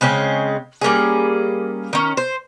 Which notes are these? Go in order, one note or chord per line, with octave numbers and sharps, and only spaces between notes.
C#3 G#3 C4 C#4
G3 A#3 C#4 G#4
D#3 C#4
C5